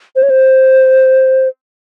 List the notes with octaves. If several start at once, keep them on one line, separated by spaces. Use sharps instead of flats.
C5
C#5
C5